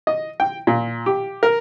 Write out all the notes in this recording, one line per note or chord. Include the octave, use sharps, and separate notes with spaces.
D#5
G5
A#2
G4
A#4